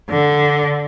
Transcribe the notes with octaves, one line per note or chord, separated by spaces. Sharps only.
D3